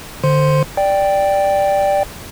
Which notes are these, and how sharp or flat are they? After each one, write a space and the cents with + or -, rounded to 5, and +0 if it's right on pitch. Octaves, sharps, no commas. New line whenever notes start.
D3 +20 C5 +0 C6 +0
D5 +0 G5 +0